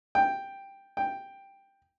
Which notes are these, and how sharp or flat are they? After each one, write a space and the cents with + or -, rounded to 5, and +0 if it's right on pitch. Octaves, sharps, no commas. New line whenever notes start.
G5 +5
G5 +5